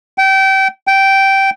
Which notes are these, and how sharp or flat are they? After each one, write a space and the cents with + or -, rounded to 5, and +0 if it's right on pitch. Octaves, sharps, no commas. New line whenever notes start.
G5 -25
G5 -10